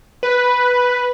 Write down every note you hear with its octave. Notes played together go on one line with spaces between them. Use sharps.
B4